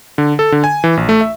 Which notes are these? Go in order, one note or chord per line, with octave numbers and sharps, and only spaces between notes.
D3
A4
D3
G#5
E3
A#1
A3
E5